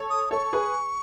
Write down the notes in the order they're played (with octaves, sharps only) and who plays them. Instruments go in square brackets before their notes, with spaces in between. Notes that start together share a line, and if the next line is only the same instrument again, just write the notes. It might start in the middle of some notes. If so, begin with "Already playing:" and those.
Already playing: [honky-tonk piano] A4 C#5
[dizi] D#6
[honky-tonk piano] A4 C#5 [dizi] C#6
[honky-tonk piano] G#4 B4